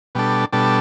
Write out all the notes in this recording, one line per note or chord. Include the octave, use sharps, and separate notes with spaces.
B2 G3 D4 A4
B2 G3 D4 A4